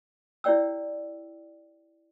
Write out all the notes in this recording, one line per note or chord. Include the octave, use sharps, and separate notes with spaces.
E4 G4 C#5 D5 G5 E6